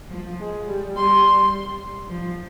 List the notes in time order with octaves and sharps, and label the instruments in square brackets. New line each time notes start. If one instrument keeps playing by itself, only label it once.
[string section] F3
G#3
G3
[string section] G3 [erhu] C6
[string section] F3